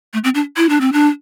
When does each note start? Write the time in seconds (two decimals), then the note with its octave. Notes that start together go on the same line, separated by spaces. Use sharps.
0.13 A3
0.24 C4
0.35 D4
0.57 E4
0.69 D4
0.81 C4
0.93 D4